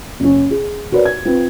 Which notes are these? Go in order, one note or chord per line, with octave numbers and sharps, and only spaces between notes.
F#1 C#4
G#4
F#4 A#4 B4 C#5 D5
G#6
C4 F4 B4